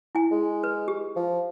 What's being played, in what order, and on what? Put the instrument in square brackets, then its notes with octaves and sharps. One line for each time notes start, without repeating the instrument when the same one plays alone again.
[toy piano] E4 G#5
[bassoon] G#3
[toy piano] B4
G4
[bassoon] F3